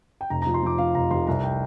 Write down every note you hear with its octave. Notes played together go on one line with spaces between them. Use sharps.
G5
F1 A#5
F3 A#5
C6
F3 D6
F3 F5
F1 A#5
F1 C6
C2 A#5
G5